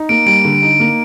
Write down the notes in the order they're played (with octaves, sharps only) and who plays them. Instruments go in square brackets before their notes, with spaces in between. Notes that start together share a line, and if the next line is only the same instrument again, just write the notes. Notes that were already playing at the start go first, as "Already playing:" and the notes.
Already playing: [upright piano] D#4
[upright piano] A#3 [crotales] D7
[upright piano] G3 [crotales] D7
[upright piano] D3
D#4
A#3